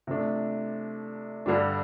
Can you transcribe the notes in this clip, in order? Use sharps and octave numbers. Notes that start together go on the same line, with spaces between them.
C3 F3 A3 D4
G2 D3 G3 D4